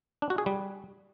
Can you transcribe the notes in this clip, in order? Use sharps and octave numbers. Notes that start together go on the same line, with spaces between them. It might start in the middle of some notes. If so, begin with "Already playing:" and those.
D4
F#4
G#4
G3